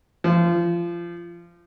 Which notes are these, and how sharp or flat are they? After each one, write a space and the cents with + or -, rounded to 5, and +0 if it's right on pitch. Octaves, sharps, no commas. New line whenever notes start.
F3 -25